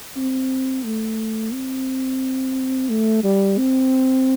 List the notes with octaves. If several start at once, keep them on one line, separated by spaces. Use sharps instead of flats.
C4
A3
C4
A3
G3
C4